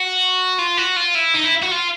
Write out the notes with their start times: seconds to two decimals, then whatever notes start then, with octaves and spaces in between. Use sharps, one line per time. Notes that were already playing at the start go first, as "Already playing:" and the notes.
Already playing: F#4
0.59 F4
0.77 F#4
0.96 F4
1.15 E4
1.34 D#4
1.43 E4
1.62 F#4
1.71 F4